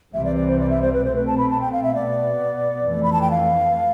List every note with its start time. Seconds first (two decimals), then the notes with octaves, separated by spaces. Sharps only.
0.13 C2 C3 E3 G3 C4 E5
0.25 D5
0.36 D5
0.48 C5
0.59 D5
0.70 E5
0.82 C5
0.94 B4
1.04 B2 A3 C4 C5
1.15 B4
1.27 A5
1.38 B5
1.50 A5
1.61 G5
1.73 F5
1.83 E5
1.95 B2 B3 D5
2.86 F2 E3 A3
3.03 B5
3.13 A5
3.21 G5
3.31 F5